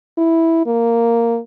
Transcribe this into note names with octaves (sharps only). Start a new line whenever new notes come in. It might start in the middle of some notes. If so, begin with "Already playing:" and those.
E4
A#3